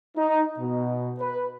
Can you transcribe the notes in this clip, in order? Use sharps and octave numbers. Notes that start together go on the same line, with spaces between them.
D#4
B2
B4